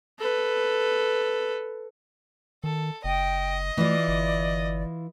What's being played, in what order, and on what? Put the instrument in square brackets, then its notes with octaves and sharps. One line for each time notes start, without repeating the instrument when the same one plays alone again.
[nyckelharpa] A4 B4
[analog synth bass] D#3 [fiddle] A4
[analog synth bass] F#1 [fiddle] D#5 [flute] G5
[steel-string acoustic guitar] E3 E4 F4 [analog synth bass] A3 [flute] D5
[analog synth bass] G1